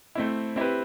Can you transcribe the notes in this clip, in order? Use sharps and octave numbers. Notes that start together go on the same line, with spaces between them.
A3 C4 E4
C4 E4 G4 B4